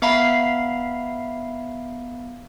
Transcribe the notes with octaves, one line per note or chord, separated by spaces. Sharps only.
B3 E5 F5 A#5 B5 C7